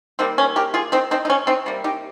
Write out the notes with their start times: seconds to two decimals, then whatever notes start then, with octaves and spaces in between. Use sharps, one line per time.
0.19 D#3 G3 A#3 C4
0.38 C#4
0.56 G4 A#4
0.74 F4 G#4
0.92 C4 D#4
1.11 C4 D#4
1.25 D#4
1.30 C#4
1.47 C4 D#4
1.66 C3 G3 A#3
1.84 D#4 G4